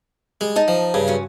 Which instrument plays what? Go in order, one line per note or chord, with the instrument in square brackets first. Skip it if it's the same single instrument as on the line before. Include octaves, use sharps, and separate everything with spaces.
[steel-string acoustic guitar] G3 [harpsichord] G#3
[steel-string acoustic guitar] D#4 D#5 A5
[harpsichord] F3
G2 C#3
[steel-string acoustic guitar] F3 F#3 C#4